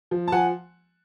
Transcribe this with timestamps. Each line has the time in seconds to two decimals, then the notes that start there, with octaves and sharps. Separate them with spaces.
0.11 F3
0.28 A5
0.32 F3 F#5 G#5